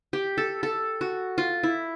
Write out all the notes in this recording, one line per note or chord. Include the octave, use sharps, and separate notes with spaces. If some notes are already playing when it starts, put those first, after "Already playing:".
G4
A4
A4
F#4
F4
E4